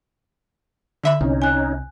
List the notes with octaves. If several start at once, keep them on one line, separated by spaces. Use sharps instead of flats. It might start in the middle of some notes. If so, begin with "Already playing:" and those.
D3 E5 B5
C2 C#4 D#4
G#5 F#6